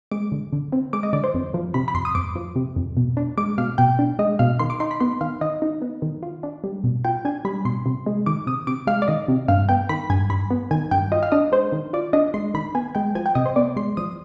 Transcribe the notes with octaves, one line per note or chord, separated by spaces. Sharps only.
G#3 D6
D3
D3
C4
G#3 D6
D#5
D3 D5
C5
F2
F3
C3 B5
B5
F2 C6
D#6
F2 D6
F3
C3
F2
B2
D4
G#3 D6
B2 F5
B2 G5
D4
G#3 D#5
B2 F5
D#3 C6
D6
D#4 C6
B5
B3 C6
D#3 F5
D#3 D#5
D#4
B3
D#3
F4
D4
G3
B2
F4 G5
D4 G#5
G3 B5
B2 C6
C3
G#3
D#3 D6
C3 D#6
C3 D6
G#3 F5
D5
D#3 D#5
C3
G2 F5
B3 G5
D#3 B5
G2 G#5
G2 B5
B3
D#3 G#5
G2 G5
F4 D#5
F5
D4 D#5
G#3 C5
D#3
F4 D5
D4 D#5
G#3 C6
D#3 B5
B3 G#5
G#3 G5
F3 G#5
G5
C3 D#5
C5
B3 D5
G#3 C6
F3 D#6